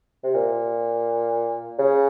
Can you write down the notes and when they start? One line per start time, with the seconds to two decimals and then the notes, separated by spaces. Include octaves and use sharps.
0.24 C3
0.34 A#2
1.79 C#3